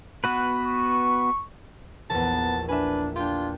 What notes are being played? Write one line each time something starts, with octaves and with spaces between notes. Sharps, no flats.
B3 F#4 B4
C#6
A#1 E2 B3 A5
D4 B4 E5 G#5
D4 F4 G4 G5